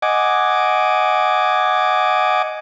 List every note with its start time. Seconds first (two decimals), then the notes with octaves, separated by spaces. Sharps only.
0.02 D#5 F#5 G#5 D6